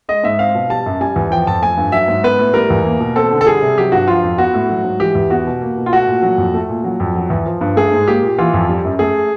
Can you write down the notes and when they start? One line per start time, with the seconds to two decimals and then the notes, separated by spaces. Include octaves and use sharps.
0.09 G#3 D#5
0.24 G#2 E5
0.39 C4 F5
0.55 B2
0.70 G3 A5
0.86 F#2
1.01 G3 G#5
1.16 E2
1.31 F3 G5
1.47 F2 A5
1.62 A3 G#5
1.77 G2
1.92 F#3 E5
2.08 G#2
2.23 B3 B4
2.39 A2
2.54 G3 A#4
2.70 E2
2.85 A#3
3.00 B2
3.16 C4 A4
3.32 D3
3.41 A4
3.46 G3 G#4
3.62 C3
3.78 F#3 G4
3.92 G2 F#4
4.07 F3 F4
4.23 F2
4.38 B3 F#4
4.54 A2
4.69 F#3
4.84 G#2
5.00 E3 G4
5.15 E2
5.30 B3 F#4
5.47 B2
5.62 A#3
5.77 B2
5.86 F4
5.93 A3 F#4
6.07 A#2
6.22 F#3
6.38 F2
6.54 A3
6.69 A#2
6.84 F#3
7.00 F2
7.15 F#3
7.30 E2
7.46 F3
7.61 G2
7.76 A3 G#4
7.92 G#2
8.07 A#3 G4
8.23 A#2
8.38 E3 F4
8.53 F2
8.69 G3
8.85 F#2
8.99 A3 G#4